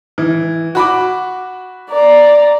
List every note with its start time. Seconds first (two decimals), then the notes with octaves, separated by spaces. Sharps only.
0.18 E3
0.75 F#4 B5 D6
1.90 D5 A#5